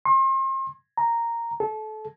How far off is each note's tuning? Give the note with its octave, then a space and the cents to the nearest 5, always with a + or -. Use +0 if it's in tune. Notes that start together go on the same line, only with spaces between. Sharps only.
C6 +40
A#5 -5
A4 -25